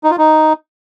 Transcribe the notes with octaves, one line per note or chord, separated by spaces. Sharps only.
D#4
F4
D#4